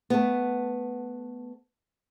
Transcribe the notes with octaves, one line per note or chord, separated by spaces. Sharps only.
A3 B3